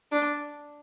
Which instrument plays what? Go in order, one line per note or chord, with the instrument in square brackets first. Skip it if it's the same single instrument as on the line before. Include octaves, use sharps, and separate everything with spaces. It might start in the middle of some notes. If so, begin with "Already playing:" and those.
[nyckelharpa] D4